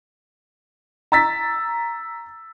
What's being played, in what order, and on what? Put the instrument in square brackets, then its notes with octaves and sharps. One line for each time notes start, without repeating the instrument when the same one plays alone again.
[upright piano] A#5 E6 A6 B6